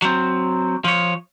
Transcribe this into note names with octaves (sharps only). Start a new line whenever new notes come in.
F#3 C4
F3 C#5